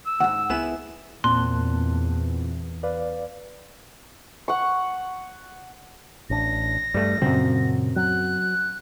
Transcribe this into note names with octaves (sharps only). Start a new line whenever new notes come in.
E6
D2 G#2 F#5
C#2 B3 E4 G#4 E7
E2 A#2 A#3 C4 A5 C6 F#6
B4 D5 F5
F#5 C#6
A1 D4 A#6
G2 G3 A3
F#2 A#2 C#3 F#3 C4
F#3 F#6